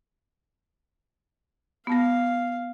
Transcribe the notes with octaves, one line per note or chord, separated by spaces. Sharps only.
B3 F5 A5 A#6